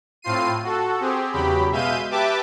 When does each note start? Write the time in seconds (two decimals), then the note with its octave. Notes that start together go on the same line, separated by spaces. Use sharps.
0.22 A2 C4 F4 C7 D#7
0.63 F#4 A4
1.00 C4 G4 G#4
1.32 E2 C#3 F#3 G4 B5
1.71 B2 G#3 E5 F5 G6 D#7
2.11 G4 B4 E5 A5 D6